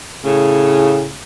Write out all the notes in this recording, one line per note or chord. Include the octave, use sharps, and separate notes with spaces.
A2 C#3